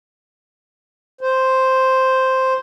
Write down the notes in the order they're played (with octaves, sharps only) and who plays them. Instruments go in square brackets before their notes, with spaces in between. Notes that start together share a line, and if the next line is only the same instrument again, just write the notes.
[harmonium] C5